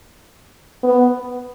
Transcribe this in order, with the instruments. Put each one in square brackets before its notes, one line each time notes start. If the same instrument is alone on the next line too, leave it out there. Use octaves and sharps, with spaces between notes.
[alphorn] B3